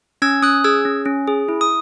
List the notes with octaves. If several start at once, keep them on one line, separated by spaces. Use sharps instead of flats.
C#4 E6 G#6
C#4 D#6 F#6
G#4 E6 G#6
C#4
C#4
G#4
E4
D#6